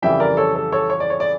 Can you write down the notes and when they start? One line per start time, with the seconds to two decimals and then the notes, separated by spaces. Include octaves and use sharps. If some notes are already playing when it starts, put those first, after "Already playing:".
0.02 F2 C#3 E3 G3 E5 G5
0.20 A#4 D5
0.37 A4 C#5
0.55 A4
0.72 A4 C#5
0.90 C#5
1.00 D5
1.10 C#5
1.20 D5